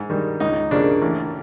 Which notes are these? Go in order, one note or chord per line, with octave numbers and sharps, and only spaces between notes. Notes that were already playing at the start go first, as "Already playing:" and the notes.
Already playing: G#2
D#3 G3
C#2 D#4
C#3 F3 A#3 D4
A1